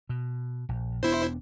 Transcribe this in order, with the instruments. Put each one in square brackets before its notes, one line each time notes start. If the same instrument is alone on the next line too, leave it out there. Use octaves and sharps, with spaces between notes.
[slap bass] B2
A#1
[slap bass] E1 B3 D4 [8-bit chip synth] E4 C5